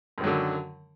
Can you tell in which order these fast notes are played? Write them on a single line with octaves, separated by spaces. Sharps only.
F#2 D#3 F#3 D3